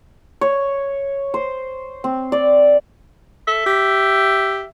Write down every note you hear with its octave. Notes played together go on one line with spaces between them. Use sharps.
C#5
C5
C4
D5
A4 E5
G4